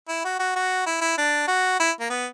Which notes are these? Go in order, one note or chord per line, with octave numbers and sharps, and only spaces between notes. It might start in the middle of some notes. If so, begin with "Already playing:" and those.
E4
F#4
F#4
F#4
E4
E4
D4
F#4
E4
A#3
B3